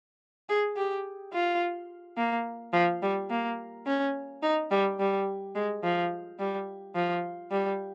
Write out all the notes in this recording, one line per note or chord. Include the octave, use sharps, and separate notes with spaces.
G#4
G4
F4
A#3
F3
G3
A#3
C#4
D#4
G3
G3
G#3
F3
G3
F3
G3